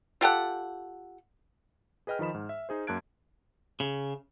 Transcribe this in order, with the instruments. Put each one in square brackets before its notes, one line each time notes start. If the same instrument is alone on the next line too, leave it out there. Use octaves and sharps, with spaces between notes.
[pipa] F4 G4 A4 F#5
[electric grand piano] G#4 B4 D#5 G5 F6
D#3 F3 D#5 B5 E7
G#2
E5
D#4 G#4 C5
F#2 A#3 A5 F#6 G#6 D7
[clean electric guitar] C#3